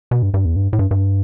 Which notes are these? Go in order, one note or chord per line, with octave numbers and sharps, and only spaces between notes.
B2
G2
G2
E2
G2
A2
G2
G2